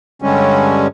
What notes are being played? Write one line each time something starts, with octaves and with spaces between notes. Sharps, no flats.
G2 D3 G3 G#3 C#4